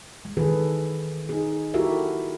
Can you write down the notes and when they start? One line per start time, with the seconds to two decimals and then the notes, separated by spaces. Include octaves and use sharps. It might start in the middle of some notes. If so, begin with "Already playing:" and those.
0.25 G#3
0.37 D#3 E3 G#4 A4 B4
1.29 D#4 G#4
1.74 E4 F#4 G4 A4 A#4 E5